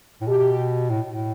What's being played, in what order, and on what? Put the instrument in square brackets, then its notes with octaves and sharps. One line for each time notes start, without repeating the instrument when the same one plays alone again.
[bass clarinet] A2
[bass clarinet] B2 [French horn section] G4
[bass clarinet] A2
A2